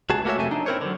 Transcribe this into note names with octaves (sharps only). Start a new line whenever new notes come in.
C#2 F#4 G#4 A5
A3 A#3 F#4 A4 C#5 E5
F2 C3 F#3 A3 G#5
D4 D#4
C4 E4 A#4 C5 C#5
D3 F#3